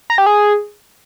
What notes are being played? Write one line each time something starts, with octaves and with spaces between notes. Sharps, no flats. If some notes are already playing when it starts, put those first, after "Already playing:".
A#5
G4
G#4